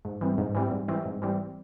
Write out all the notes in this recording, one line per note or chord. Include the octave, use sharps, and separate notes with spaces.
G#2
E3 G3 C4
G#2
E3 G3 C4
G#2
E3 G3 C4
G#2
E3 G3 C4